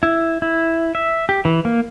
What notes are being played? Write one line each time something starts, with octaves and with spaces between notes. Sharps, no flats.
E4
E4
E5
G4
E3
A#3